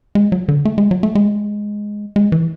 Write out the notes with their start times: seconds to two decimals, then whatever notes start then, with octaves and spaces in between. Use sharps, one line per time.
0.15 G#3
0.32 F#3
0.48 D3
0.65 A3
0.78 G#3
0.91 F#3
1.03 A3
1.15 G#3
2.16 G#3
2.32 E3